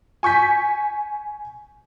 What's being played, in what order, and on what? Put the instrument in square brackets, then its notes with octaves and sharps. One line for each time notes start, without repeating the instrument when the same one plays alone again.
[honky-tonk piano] G#5 C#6 G6 B6